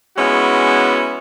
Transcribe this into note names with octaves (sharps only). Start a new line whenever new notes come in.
G#3 B3 C#4 E4 F#4